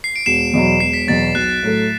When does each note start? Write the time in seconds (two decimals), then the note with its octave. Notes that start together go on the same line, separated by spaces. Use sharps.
0.04 C7
0.16 D7
0.26 E1 C7 E7
0.53 E2 B2 F#3
0.80 E1 C7
0.93 B6
1.07 E2 B2 F#3 A6
1.35 B1 F#6
1.63 A2 F#3 A3